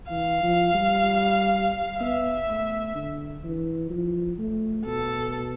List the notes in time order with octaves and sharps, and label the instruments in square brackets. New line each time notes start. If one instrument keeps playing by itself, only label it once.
[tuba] E3 [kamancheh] F5
[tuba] F3
G3
[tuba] B3 [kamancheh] E5
[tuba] A3
D3
E3
F3
A3
[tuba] B2 [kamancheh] A4